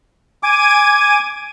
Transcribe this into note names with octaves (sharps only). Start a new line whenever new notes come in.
G#5 D6 G#6 D#7